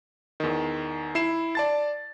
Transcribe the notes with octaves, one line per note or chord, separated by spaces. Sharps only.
E2 D#3
E4 C7 E7
D5 A5 A6